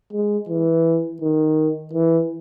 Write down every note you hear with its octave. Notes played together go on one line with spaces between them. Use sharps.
G#3
E3
D#3
E3